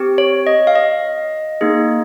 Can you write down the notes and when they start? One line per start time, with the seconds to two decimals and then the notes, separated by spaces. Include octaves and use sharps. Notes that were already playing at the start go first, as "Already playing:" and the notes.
Already playing: C4 G4
0.18 C#5
0.47 D#5
0.67 F5
0.76 D#5
1.61 A#3 D#4 G#4